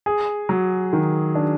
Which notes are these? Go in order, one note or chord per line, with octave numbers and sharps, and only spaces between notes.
G#4
F#3
D#3
D4